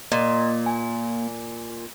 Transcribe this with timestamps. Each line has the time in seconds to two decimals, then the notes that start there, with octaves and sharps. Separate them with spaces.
0.12 A#2 A#3 D#5
0.66 G#5